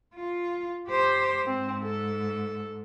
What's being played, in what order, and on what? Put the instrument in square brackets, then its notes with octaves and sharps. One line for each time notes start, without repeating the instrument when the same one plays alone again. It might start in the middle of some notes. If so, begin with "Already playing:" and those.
[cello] F4
G4 C5
[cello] G#2 [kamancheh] C4
[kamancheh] A4